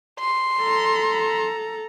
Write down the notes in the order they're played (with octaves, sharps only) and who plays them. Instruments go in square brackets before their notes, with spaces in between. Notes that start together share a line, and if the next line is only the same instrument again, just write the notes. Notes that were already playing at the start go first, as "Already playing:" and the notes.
[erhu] C6
[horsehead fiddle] A4 A#5